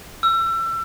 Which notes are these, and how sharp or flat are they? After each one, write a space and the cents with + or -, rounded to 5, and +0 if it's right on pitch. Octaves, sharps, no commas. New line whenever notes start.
E6 +30